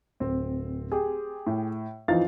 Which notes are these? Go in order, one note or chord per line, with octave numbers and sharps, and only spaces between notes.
D1 C4
G4 G#4
A2
F2 E3 F3 D#4 F5 A6